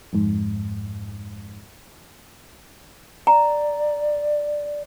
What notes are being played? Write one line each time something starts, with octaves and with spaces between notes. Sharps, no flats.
F2 G#2
D5 A#5